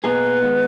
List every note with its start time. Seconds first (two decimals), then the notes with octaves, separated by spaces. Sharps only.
0.04 B2 A#3 D#4 G#4 B4
0.42 D#3 G#3 B3 D#4